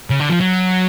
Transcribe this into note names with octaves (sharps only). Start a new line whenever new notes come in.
C#3
D3
F3
F#3